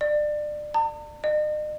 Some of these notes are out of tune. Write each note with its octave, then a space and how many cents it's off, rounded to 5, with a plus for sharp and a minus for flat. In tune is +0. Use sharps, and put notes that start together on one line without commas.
D5 +25
A5 +45
D#5 -45